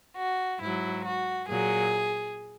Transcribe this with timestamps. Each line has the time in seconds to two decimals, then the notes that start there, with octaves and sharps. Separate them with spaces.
0.16 F#4
0.60 G#2 F#3 E4
1.05 F#4
1.48 A#2 F#3 G#4